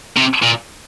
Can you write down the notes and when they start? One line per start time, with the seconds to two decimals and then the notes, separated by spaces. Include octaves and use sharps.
0.17 C3
0.43 A#2